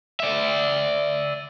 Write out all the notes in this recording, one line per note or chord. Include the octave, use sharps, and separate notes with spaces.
D5 E5